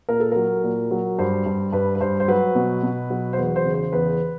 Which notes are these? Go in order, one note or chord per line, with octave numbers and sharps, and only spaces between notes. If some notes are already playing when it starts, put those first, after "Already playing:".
A#2 A#4
A4
F#3 A#4
A#2
F#3
G2 C5
G2
G2 B4
B4
G2 C5
C5
F#3 B4
B2
B2
F#3
C5
E2 B4
C5
C#3
C5
E2 B4